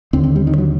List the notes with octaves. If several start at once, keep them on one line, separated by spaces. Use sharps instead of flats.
D#2 D3 C4
C4
G3
D#3
F#3